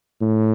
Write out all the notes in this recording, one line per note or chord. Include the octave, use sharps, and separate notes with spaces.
A2